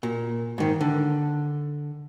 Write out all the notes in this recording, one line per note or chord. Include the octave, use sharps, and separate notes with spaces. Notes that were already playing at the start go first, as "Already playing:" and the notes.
A#2
G#2 D#3
D3